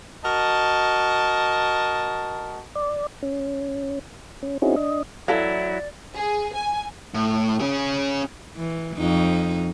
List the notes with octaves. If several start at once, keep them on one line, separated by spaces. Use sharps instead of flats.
F#4 A#4 D#5 A5
D5
C#4
C#4
C4 C#4 D#4 E4 F#4 G#4
D4 D#5
E3 F#3 E4 A4 D5 F5
G#4
G#5
A2
C#4 G#4
E3
F2 D#4